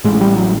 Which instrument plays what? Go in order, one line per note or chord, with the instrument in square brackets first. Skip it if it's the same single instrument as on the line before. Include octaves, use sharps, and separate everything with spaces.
[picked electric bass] A1 A2 G#3
G#3
G3
F#3